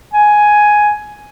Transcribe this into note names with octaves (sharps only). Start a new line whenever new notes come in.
G#5